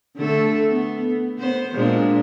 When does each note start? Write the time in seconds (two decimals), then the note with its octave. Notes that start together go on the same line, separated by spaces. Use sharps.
0.16 D3 A3 A4
0.70 B3
1.39 B3 C5
1.73 A#2 G#3 D4